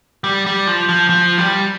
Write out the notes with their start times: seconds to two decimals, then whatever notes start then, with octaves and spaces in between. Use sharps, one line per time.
0.24 G3
0.46 G3
0.67 F3
0.89 F3
1.10 F3
1.38 G3